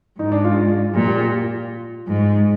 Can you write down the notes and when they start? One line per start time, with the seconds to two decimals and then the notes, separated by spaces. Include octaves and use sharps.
0.19 G#2 D#4
0.32 D4
0.44 F4
0.94 A#2 G4
1.01 F4
1.07 G4
1.20 G4
1.32 F4
2.07 G#2